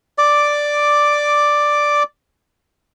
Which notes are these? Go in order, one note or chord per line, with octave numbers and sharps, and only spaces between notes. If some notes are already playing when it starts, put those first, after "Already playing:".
D5 D6